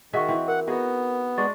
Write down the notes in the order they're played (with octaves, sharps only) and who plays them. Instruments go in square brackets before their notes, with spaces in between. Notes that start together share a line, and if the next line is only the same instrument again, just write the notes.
[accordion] D#3 [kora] F#4 G#4 E5 [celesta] D#5 F#5 C#6
[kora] E3 C4
[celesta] A#4 [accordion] F#5
[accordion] B3 [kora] D#4 F#4 G#4
[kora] G#3 D4 [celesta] D5 C#6 A6